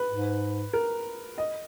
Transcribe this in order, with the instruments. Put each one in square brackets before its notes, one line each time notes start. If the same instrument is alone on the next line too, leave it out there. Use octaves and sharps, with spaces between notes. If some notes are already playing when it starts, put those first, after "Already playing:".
Already playing: [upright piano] B4
[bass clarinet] G#2
[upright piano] A#4
D#5